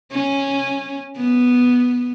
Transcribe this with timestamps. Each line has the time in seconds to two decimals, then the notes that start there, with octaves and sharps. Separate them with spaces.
0.11 C#4
1.16 B3